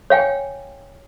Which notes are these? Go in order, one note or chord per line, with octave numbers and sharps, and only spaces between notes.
C#5 F5 G5 G#5